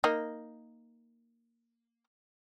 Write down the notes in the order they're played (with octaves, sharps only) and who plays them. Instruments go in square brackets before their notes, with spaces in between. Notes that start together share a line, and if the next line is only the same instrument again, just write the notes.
[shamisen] A#3 D#4